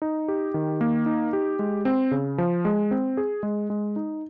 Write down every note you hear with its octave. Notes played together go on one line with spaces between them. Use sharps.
D#4
G4
D#3
A#3
D#4
G4
G#3
C4
C#3
F3
G#3
C4
G#4
G#3
G#3
D#4